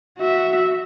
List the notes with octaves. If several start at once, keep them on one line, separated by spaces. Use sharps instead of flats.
F#4 E5